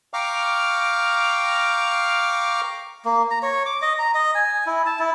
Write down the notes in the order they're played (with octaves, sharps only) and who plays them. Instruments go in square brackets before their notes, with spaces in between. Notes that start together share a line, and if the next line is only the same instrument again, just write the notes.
[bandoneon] F5 G5 A#5 C#6 D6 F6
[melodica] A#3
A#5
C#5
D6
D#5
A#5
D#5
G#5
E4
A5
E4